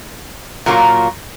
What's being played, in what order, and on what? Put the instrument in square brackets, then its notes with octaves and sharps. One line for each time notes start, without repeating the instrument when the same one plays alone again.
[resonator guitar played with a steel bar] A#2 F#3 A#3 F4